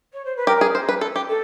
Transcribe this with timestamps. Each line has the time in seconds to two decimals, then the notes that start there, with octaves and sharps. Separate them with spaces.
0.13 C#5
0.24 C5
0.36 B4
0.47 G4 A#4
0.61 G#4
0.75 C5
0.89 B4
1.01 A4
1.16 G4
1.29 A4